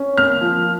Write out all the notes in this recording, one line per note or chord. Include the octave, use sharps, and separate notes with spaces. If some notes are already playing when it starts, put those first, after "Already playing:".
Already playing: C#4
A#3 F6
F3